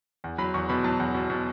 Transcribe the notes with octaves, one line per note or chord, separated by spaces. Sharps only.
E2
F#3 B5
E2 C#6
B2 B5
F#3 A5
E2
B2
B2